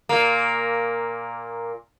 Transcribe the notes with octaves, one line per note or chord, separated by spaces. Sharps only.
A#2 A#3